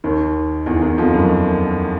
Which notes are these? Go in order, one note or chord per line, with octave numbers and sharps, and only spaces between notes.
D#2 D#3
E2 E3
D#3
E2 E3
F2 F3
F#2 F#3